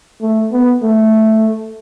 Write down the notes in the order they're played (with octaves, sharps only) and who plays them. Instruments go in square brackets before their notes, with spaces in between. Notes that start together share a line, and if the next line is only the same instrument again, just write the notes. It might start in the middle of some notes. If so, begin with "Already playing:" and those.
[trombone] A3
B3
A3